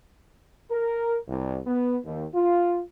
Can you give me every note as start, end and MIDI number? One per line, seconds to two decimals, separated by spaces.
0.71 1.18 70
1.28 1.59 36
1.67 1.98 59
2.05 2.26 39
2.35 2.80 65